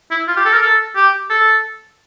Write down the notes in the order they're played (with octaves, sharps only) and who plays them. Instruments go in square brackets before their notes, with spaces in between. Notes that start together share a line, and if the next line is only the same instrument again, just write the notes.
[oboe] E4
F4
G4
A4
A#4
A4
G4
A4